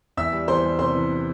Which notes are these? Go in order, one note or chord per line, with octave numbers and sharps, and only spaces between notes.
E2 E5 E6
G3
E2 C5 C6
G3
C3 C5 C6
E3
C3